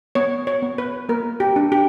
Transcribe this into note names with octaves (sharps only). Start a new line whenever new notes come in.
B3 C#5
C#5
B3
B4
A#3 A#4
G4
D4
G4